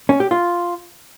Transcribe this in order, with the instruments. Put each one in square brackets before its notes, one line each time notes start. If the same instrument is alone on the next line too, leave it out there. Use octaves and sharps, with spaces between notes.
[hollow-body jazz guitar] C#4
G4
F4